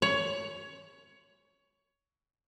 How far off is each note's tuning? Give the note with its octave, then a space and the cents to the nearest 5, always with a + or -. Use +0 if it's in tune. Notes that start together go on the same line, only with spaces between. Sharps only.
C#5 +15